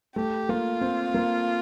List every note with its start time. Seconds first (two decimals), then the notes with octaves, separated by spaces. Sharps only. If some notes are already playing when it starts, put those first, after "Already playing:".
0.16 A3 G4
0.49 A#3 F4
0.81 C4
1.14 A#3